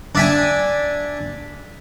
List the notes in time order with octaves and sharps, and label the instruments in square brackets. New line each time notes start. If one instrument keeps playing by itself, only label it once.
[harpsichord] D4 E5 G#5